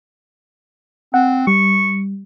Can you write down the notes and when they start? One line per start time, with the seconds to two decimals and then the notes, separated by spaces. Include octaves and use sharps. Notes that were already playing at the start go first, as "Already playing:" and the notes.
1.14 C4 F#5
1.47 G3 C#6